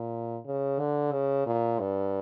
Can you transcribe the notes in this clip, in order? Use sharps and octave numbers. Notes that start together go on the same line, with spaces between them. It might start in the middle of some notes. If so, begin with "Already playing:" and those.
Already playing: A#2
C#3
D3
C#3
A#2
G2